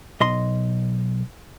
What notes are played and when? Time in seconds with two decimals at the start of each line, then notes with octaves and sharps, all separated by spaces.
0.20 B1 D#5 C6